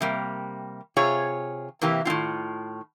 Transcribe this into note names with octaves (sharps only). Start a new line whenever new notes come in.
C3 G3 A#3
C3 F4 G#4 C#5
C3 E3 A#3 G4
A2 D#3 C4 F4